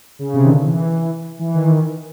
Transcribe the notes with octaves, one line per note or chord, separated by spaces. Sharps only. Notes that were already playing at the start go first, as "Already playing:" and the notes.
C#3
C3
D#3
D3
E3
E3
D#3
D#3